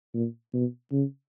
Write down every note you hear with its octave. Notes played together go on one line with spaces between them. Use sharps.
A#2
B2
C#3